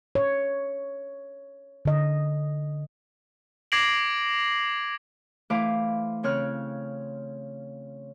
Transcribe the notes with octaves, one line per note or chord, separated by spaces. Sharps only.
C#5
D3 D#5
D6 G#6 A#6 C7 D7 F#7
E3 A3 B4 C5 F5 D6
C#3 C4 C#5 F6 F#6